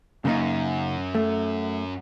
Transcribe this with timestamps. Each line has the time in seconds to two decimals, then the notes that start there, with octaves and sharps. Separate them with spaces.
0.25 F#2 C#3 A#3 D#4
1.15 A3